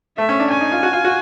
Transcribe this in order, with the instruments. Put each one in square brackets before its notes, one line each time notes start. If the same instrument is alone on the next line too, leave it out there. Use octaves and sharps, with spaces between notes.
[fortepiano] A3 [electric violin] E5
[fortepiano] C#4
D4
[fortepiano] C#4 [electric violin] G#5
[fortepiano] D#4
F4
F#4
F4
F#4